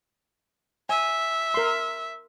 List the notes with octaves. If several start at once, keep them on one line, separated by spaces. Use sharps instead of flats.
E5 G#5
A#4 C6